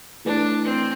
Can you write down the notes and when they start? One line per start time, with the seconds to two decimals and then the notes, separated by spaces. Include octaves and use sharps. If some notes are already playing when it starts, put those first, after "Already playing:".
0.25 E3 A3 D4 E4 B4
0.64 C4